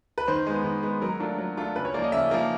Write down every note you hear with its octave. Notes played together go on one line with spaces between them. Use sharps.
B4
D#3 C5
G#3 B3
D#3
G#3 B3
F#3 A#4
A3 D4 F4
F#3
A3 D4 F4
C#3 B4
C#5
F3 A#3 D5
D#5
C#3 E5
F3 A#3